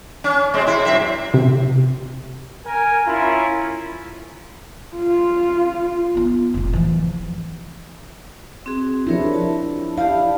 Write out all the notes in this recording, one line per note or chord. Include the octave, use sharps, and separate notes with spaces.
C#4
B2 G#3 C4
C3 E4
F#2 C4 E5
C3
A#4 G#5
C#4 E4 F4 A#4
F4
B3 D#4
F1 A2
E3 F3
C4 F#4 G#4
F3 D4 E4 G4 A#4 C#5
A5
E4 G4 D5 F5 A5